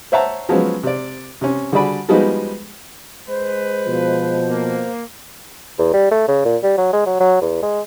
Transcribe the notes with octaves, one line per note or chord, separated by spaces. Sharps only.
C5 C#5 E5 F#5 A5 A#5
F3 F#3 G#3 B3 C#4
C3 D5
C3 C#4
D3 G3 F#4 G#4 D5 B5
F3 G3 G#3 B3 D#4 F#4
G#3 B4 C5
B2 F3
A#3
E2
G3
A3
C#3
A#2
G3
F#3
G#3
F#3
F#3
E2
G#3